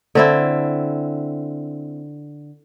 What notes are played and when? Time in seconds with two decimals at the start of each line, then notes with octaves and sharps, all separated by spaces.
0.15 D3 C4 E4